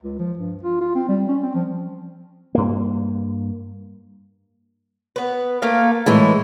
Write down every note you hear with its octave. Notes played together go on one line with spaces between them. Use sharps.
C#2
F3
G2
F4
F4
C4
G3
C#4
C4
F3
G2 A#3
B3 B4
A3 A#3 F5
A2 E3 G#3 E4